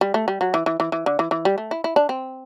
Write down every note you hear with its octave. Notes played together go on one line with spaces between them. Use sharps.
G3
A3
G3
F#3
E3
E3
E3
E3
D3
E3
E3
G3
A3
E4
E4
D4
C4